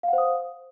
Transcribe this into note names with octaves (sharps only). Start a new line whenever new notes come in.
C5 F5 F#5 D#6